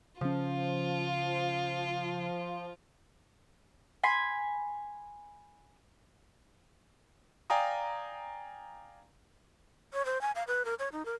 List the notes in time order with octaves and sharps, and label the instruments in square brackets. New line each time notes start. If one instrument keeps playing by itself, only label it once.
[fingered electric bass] C#3 C#4 [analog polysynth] F3 [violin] F4
[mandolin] G#5 B5 C6
[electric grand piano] D5 F5 G5 G#5 A#5 D#6
[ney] C#5
C5
G#5
F5
B4
A#4
C#5
D#4
A#4